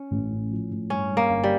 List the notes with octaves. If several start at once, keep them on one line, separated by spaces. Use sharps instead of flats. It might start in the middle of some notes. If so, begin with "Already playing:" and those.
Already playing: C#4
A1
A2
F3
A2
G2 C#4
G2
A#3
G1
G3